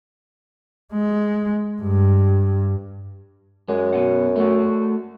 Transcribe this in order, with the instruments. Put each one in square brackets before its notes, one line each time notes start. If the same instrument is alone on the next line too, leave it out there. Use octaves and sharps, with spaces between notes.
[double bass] G#3
G2
[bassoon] F#2 [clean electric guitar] G#3
[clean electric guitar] B2 F#5
A3 F#4